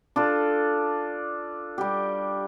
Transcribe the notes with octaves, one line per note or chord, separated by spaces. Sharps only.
D4 F4 A4
G3 G4